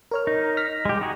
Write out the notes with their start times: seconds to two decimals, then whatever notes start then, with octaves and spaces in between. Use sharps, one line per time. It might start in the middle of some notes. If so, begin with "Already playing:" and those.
0.11 A#4 C#5 F6
0.27 D#4
0.57 F6 A#6 B6
0.85 G#3 G4
1.01 D#4 F#4 G#4